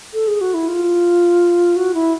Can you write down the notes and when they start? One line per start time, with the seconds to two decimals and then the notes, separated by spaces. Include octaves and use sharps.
0.14 A4
0.27 G#4
0.41 F#4
0.54 E4
0.68 F4
1.76 F#4
1.94 E4